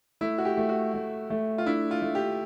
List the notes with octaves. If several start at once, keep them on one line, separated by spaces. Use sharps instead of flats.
A3 E4
F#4
G4
A3
F#4
A3
A3
F4
D4 E4
F4
A3
G4